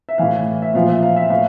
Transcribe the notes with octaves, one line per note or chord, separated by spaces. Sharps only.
E5
A2 E3 F5
E5
A#2 F3 F5
E5
F5
E5
A2 F5